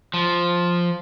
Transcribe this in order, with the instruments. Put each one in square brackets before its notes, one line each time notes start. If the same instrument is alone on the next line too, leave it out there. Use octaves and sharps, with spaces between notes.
[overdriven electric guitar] F3